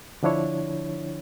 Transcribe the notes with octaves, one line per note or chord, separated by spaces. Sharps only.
D3 F3 D4 E4 C#5